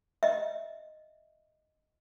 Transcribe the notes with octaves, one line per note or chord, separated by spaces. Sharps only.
D#5 E5